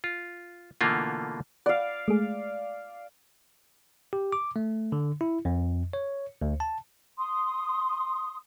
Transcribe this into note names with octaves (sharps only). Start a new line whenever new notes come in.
F4
B2 D3 E3 A3 A#3 F4
D5 F5 F#5
G#3 A3 G#4
G4
D6
A3
D3
E4
F2
C#5
D2
A5
C6 D#6